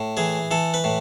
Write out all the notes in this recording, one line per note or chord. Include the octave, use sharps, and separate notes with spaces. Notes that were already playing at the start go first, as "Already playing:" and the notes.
Already playing: A2
E3 G#4
E3 A4
B4
A2